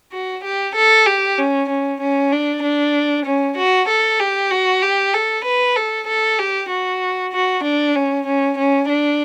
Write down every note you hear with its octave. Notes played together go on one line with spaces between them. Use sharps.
F#4
G4
A4
G4
C#4
C#4
C#4
D4
D4
C#4
F#4
A4
G4
F#4
G4
A4
B4
A4
A4
G4
F#4
F#4
D4
C#4
C#4
C#4
D4